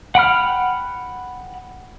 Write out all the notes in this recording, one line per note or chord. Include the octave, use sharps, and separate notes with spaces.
F#5 G5 B5 F6